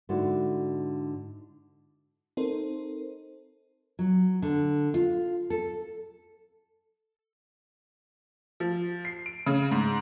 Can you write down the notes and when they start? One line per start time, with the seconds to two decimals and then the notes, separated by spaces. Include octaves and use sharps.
0.09 G#2 D3 E4 F#4
2.37 C4 D#4 A4 A#4 C5
3.99 F#3
4.42 D3
4.94 F4
5.50 A4
8.60 F3
9.05 C7
9.26 D7
9.46 C#3
9.71 G#2